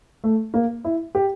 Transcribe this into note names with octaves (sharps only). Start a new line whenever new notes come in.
A3
A#3
E4
G4